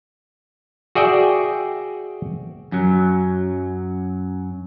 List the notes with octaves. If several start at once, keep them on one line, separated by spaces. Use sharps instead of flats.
F#4 G#4 D5 E5 G5
F#2 F#3